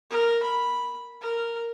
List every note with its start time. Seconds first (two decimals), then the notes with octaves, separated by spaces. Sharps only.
0.10 A#4
0.43 B5
1.21 A#4